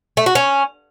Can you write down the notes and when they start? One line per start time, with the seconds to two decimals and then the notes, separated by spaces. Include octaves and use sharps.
0.17 A3
0.26 F#4
0.35 C#4